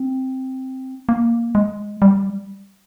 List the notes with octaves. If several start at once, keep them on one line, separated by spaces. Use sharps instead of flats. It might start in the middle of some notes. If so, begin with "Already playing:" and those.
Already playing: C4
A#3
G#3
G3